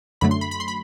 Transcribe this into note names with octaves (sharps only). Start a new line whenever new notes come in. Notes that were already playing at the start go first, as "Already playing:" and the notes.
F#2 D3 F#3 A3 B5
C6
B5
B5
C6
B5